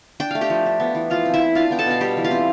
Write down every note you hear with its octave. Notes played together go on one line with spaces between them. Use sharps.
D4 G5
A3 F5
G4 G5
F3
D4
B3
E3
F3 F4 F5
C4
E4 E5
C4
D4 F4 F5
B3 G5
A4 A5
B2 F5
G3 G4 G5
E3
F4 F5
C4